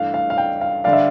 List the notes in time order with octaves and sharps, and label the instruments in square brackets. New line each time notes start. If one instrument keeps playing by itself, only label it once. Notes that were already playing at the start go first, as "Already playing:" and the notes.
Already playing: [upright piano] G2 E3 A3 D4 [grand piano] F5
[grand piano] F5
F5
G5
F5
[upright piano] D3 G3 D4 [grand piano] F5
[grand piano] E5